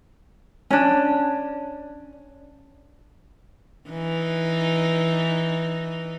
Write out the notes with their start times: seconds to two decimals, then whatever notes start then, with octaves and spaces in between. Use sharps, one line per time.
0.71 C#4 D4
3.90 E3 D#4